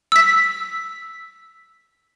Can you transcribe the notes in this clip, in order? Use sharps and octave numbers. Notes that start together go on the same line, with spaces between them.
E6 B6